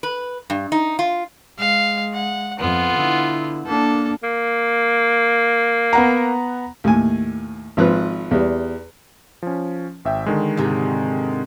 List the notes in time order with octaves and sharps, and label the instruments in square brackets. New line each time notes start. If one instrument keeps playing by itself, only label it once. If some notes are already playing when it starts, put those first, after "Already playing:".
[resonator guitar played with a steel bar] B4
G2
D#4
F4
[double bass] G#3 [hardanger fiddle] F5
[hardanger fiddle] F#5
[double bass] F2 [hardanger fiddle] B3 F4
[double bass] D3 E4
[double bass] A#3 D4 [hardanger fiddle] A4
[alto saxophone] A#3
[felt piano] B3 F#5 A#5
[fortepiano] D#2 A2 G#5
G#1 F3 B4
E2 G3
[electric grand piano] F3 C#4
G#1 E5 G5
D3 D#3 G#3
[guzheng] G#2 C3